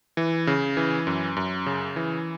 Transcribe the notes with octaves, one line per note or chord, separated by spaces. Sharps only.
E3
C#3
E3
F#2
F#2
C#3
E3